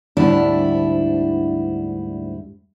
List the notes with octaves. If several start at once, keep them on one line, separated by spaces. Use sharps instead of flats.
D2 G#2 G3 D4 E4